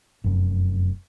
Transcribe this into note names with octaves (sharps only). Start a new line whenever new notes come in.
F1 F#2